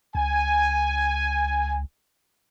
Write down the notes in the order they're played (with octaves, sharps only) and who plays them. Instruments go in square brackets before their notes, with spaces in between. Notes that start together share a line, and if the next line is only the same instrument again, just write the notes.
[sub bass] C#2 [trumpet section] G#5